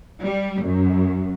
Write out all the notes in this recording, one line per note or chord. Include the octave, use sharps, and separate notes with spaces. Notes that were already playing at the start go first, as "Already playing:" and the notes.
G3
F#2